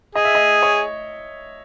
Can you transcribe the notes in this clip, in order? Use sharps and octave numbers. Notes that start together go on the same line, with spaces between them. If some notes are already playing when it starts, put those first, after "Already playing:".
G#4 D#5
E5
D#5
C#5